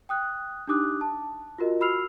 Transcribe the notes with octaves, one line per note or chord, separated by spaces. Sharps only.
G5 D#6 F#6
D4 D#4 G4 D6 D#6 F#6
A5
F4 F#4 A#4 D#5
F#4 B5 E6 F6 C7 F7